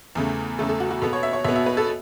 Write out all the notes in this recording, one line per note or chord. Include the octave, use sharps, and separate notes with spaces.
E2 C#3 A3
E2 C#3 A3 A4
A4
F#4
F#4
B2 B3 A4
C#5
E5
C#5
B2 B3 E5
E5
B4
A4